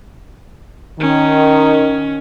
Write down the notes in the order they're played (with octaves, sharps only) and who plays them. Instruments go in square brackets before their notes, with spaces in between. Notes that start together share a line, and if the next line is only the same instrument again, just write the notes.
[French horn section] D#3 [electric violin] C#4